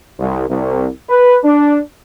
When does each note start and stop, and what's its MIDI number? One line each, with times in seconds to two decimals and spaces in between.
0.18 0.46 36
0.48 0.87 36
1.08 1.37 71
1.43 1.79 62